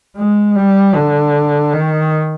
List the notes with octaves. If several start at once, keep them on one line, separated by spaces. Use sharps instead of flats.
G#3
G3
D3
D#3